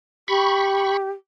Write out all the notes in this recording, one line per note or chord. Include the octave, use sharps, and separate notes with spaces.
G4 B5 C#6